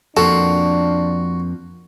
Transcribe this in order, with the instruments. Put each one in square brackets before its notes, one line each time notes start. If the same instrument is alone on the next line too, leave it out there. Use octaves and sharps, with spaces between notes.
[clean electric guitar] F2 F3 A#3 [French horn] D4 [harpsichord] F#4 [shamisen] A4